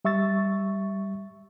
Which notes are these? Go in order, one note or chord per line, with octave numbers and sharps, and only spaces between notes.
G3 E5 C#6 E6 A6